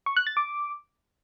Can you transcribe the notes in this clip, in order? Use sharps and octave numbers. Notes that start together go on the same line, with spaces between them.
C#6
F#6
A6
D6